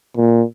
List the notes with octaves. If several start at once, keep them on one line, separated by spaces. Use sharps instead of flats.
A#2